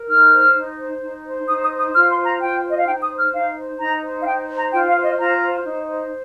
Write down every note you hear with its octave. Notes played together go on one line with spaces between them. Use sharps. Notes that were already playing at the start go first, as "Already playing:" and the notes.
Already playing: A#4
D#4 F6
C5
D#4
C5
D#4
C5
D#4 D#6
D#6
C5
D#6
F4 F6
C6
C5
A#5
F4 G5
C5 D#5
F5
D#4 G5
D#6
C5
F6
D#4 F5
C5
D#4 A#5
C5
F5
D#4 G5
C5
A#5
F4 G5
F5
C5
D#5
F4 A#5
C5
D#4
C5